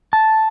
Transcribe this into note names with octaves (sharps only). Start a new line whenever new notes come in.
A5